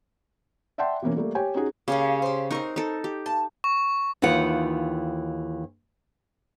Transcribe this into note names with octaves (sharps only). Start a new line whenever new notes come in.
D5 E5 F#5 G5 A5 C6
B2 E3 A#3 C#4
G3 A3 A#3
G4 C#5 G5 G#5
C#4 D#4 F#4 G#4
C#3 A#3 C#4 G4
G4 C5
C4 D#4 A#4 C#6
D#4 A4
G4
A5
C#6
D#2 E3 D#4 F4 F#5